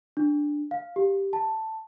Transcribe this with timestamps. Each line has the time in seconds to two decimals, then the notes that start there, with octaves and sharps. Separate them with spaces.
0.17 D4
0.71 F5
0.96 G4
1.33 A5